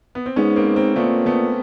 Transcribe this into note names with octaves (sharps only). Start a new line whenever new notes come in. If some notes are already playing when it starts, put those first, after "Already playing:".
B3
C4
G#2 B3 C#4
A#3 C4
A#3 C4
A#2 A3 B3
A3 B3